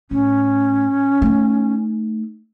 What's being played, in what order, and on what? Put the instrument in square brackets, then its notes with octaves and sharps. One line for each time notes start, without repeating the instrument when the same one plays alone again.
[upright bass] A2 [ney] C#4
[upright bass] A3 D#4